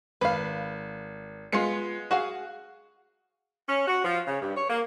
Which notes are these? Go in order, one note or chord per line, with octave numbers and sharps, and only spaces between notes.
G#1 B4 F5
G#3 B3 F4 C#7
F#4 G#4 F5 F#5
C#4
F#4
F3
C#3
G2
C#5
A#3